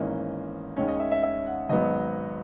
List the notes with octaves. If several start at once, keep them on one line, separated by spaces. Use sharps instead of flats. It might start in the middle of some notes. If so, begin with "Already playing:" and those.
Already playing: G#1 G#2 E3 A#3 C#4 D#5
D#2 D#3 G#3 C#4 C#5
D#5
E5
E5
E5
F#5
G#1 G#2 F#3 B3 D#5